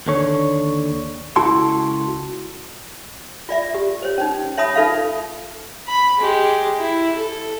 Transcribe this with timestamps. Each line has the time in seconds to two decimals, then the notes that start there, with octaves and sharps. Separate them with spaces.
0.07 D#2 D3 C#5
1.36 C#2 E4 F#4 A4 A5 C6
3.49 F4 D5 E5
3.75 G4
4.02 C5 C#5
4.18 C#4 D#4
4.57 C#5 E5 A5 B5 D#6
4.75 D#4 F4 A4 B4 E5 F5
5.87 B5
6.19 G#3 G4
6.78 E4
7.16 A4